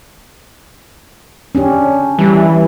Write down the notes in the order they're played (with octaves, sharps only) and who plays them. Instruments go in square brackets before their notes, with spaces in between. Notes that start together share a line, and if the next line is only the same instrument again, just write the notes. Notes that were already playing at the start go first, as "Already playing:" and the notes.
[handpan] C#4 D4 G4
[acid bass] E3 [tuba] G3